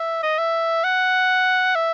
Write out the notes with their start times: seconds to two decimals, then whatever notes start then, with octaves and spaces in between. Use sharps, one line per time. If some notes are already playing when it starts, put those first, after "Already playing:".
Already playing: E5
0.23 D#5
0.38 E5
0.84 F#5
1.75 E5